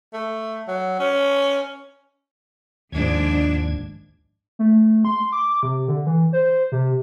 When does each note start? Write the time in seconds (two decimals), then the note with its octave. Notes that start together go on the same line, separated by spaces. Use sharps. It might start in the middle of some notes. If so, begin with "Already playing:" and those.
0.13 A3
0.68 F#3
0.99 C#4
2.92 D#2 G#2 F3 D4 G#6
4.59 A3
5.05 C6
5.32 D6
5.63 C3
5.88 D3
6.06 E3
6.33 C5
6.72 C3